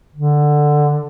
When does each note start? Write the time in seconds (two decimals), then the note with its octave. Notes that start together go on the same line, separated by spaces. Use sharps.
0.14 D3